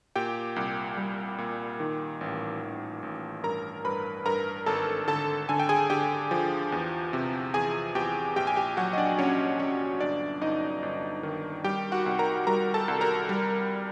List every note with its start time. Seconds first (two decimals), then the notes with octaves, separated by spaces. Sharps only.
0.16 A#2 G4 G5
0.56 C2
0.97 G3
1.38 A#2
1.80 D#3
2.21 A1
2.62 A1
3.03 A1
3.44 G2 A#4 A#5
3.85 G2 B4 B5
4.26 G2 A#4 A#5
4.66 G#1 A4 A5
5.08 D3 A4 A5
5.49 D3 G#5
5.59 G5
5.69 G#4 G#5
5.90 D3 G4 G5
6.31 F3
6.72 E2
7.13 C3
7.54 E2 G#4 G#5
7.95 E2 G4 G5
8.36 A#1 G4 G5
8.47 G#5
8.56 G4 G5
8.77 F#3 F#4 F#5
8.93 D#5
8.98 D4 D5
9.19 A#1 C#4 C#5
9.59 A#1 C#4 C#5
10.00 G1 D4 D5
10.41 G1 D#4 D#5
10.83 G1
11.23 D#3
11.64 G3 G4 G5
11.92 F#4 F#5
12.06 C2
12.19 A#4 A#5
12.47 G3 A#4 A#5
12.74 A4 A5
12.88 C2
13.01 A#4 A#5
13.29 G3